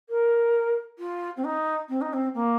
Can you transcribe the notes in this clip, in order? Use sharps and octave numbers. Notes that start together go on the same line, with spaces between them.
A#4
F4
C4
D#4
C4
D#4
C4
A#3